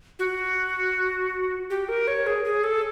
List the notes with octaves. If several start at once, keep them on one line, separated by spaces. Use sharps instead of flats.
F#4
G4
A#4
C#5
G#4
G#4
A4